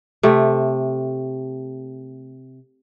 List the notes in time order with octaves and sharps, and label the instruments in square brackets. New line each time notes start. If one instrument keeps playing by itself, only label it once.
[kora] C3 A3